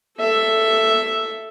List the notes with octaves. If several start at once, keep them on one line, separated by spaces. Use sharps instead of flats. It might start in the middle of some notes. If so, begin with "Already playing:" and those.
A4 E5